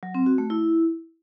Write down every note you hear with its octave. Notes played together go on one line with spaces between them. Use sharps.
F#3
C4
F#4
A3
E4